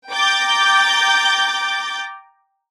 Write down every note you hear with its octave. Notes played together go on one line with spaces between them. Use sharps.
G5 A#5 D6 G6 A6